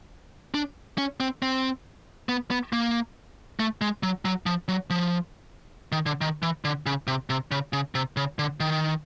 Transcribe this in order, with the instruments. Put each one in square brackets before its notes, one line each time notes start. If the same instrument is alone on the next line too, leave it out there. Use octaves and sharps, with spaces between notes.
[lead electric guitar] D4
C#4
C4
C4
B3
B3
A#3
A3
G#3
F#3
F#3
F3
F#3
F3
D#3
D3
D#3
E3
D3
C#3
C3
C3
C#3
C#3
C3
C#3
D3
D#3